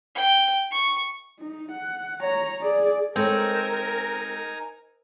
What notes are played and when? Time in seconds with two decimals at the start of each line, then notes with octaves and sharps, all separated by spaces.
0.16 G5
0.71 C#6
1.39 D#4
1.72 F#5
2.21 C#5 A#5
2.61 G#4 D5
3.16 G#3 C4 D#4 A4 A#4 C#5 G#5 A#5